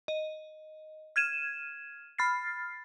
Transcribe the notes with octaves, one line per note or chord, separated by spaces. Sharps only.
D#5
F6 G#6 D#7 E7
B5 F6 A6 C7